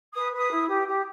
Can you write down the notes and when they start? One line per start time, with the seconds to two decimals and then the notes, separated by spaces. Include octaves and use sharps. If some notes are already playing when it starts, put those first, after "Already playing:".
0.14 B4 D#6
0.33 B4 D#6
0.51 E4
0.68 G4
0.87 G4